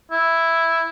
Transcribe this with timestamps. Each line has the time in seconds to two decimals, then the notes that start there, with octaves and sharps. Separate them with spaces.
0.12 E4